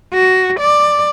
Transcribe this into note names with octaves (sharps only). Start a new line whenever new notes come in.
F#4
D5